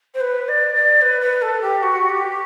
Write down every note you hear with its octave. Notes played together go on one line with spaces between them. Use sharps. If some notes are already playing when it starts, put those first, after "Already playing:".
C5
B4
D5
D5
B4
B4
A4
G4
F#4
G4